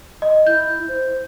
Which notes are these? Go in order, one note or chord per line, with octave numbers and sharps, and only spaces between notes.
D#5
E4 G6
C5